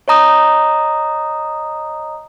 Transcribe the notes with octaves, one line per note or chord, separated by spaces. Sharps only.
C#5 D#5 A#5 D#6